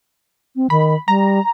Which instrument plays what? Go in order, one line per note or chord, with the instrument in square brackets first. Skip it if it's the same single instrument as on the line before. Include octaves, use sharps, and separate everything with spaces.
[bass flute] C4
[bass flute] D#3 [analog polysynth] B5
[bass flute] G3 [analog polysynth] A#5